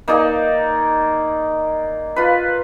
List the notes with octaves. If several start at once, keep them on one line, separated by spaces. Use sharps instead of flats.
A#3 D#4 G#4 D5
F4 B4